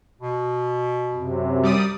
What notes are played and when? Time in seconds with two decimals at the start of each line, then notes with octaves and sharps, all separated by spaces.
0.21 B2
1.13 F#2 C3
1.63 G3 D5 D#6